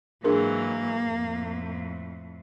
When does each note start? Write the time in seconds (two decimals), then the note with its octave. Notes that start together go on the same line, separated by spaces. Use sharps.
0.24 G#2 E3 F#3 A#3 D4 G#4 A#4
1.05 F2 A2